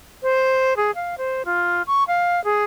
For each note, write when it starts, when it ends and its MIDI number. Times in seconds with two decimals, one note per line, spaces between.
0.23 0.74 72
0.77 0.91 68
0.95 1.15 77
1.18 1.43 72
1.45 1.82 65
1.87 2.04 85
2.08 2.43 77
2.44 2.64 68